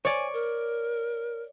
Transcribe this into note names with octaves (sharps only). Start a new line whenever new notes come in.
C#5 D5 G#5
A#4